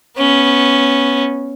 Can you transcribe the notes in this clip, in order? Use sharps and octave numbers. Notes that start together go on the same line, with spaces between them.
B3 C#4